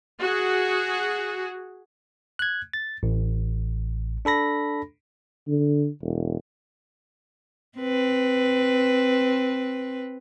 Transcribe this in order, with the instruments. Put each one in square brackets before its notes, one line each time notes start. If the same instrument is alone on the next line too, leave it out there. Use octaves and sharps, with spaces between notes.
[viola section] F#4 G#4
[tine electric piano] F#6 G#6
A6
A1
D4 A4 B5 A#6
[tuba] D3
E1
[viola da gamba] C4 B4